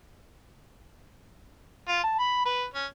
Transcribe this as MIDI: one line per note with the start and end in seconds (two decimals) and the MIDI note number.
1.88 2.04 65
2.04 2.16 81
2.19 2.40 83
2.45 2.65 71
2.74 2.87 61